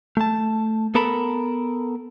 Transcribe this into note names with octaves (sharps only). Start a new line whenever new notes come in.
A3 A5
B3 A4 A#4 A5 B5